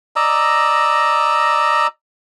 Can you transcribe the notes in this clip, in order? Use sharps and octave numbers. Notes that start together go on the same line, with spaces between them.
D5 D#5 A#5 E6